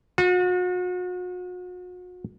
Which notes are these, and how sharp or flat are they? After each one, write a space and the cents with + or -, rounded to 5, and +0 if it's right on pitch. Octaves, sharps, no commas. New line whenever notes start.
F#4 -40